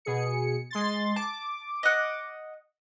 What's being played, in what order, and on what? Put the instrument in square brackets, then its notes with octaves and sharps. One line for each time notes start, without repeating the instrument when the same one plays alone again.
[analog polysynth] B2 G#4 C#7
G#3 C6 A6
[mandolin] A5 [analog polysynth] D6
[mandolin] D#5 F#5